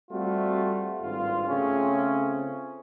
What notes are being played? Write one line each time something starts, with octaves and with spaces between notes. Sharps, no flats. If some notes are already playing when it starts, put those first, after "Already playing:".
G3 A3 C4 F4 F#4
G#1 G2 C4 F4
C#3 A3 C4 C#4 F4 G#4